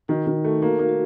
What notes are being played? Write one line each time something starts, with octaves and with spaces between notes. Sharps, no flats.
D#3 D#4 F#4
D#3
A3
A#3 D#4 F#4
A#3
F#4 A#4